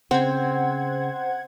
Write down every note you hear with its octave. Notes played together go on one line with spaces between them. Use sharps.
C#3 C4 C5 F#5 G#6